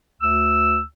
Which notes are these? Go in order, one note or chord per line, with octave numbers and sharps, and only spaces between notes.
D2 E6